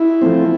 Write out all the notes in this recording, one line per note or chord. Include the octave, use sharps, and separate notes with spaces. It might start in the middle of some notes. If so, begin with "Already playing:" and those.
Already playing: E4
F3 A3 C4